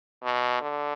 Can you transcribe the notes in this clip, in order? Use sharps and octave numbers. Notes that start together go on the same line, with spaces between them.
B2
D3